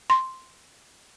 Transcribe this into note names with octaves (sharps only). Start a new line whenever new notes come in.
C6